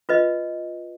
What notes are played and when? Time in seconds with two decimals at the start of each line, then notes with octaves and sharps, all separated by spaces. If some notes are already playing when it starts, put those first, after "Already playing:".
0.09 F4 B4 D#5